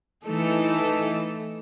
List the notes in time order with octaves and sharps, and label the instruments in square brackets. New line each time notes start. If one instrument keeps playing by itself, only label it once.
[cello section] E3 A3 D#4 A4